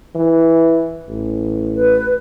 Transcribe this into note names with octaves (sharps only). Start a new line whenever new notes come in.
E3
A1
B4